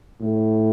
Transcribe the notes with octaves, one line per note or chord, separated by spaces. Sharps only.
A2